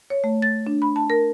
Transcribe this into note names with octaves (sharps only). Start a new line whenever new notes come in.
C#5
A3
A6
D4
B5
A5
A#4